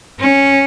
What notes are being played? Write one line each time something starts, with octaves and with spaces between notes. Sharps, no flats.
C#4